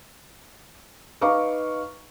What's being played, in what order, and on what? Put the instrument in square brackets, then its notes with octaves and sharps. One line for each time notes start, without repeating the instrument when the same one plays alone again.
[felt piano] D#4 B4 F5 A#5 C#6 D6